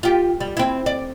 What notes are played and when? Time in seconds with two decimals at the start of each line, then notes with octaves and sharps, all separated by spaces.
0.03 F4 G4
0.40 G3
0.57 C4 E4
0.86 D5